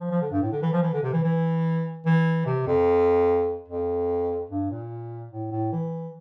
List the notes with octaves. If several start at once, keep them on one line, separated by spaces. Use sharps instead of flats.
F3
F3
D3
G2
A2
D3
E3
F3
E3
D3
C3
E3
E3
E3
C3
F2
F2
G2
A#2
A2
A2
E3